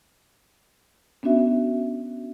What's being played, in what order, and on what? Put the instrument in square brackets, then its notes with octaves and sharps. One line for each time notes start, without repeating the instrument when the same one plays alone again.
[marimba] B3 C#4 D4 F#4 E5